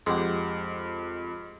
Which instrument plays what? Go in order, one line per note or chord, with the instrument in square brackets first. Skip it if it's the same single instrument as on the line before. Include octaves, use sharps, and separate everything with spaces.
[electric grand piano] F2 [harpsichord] G#3 G4 F#5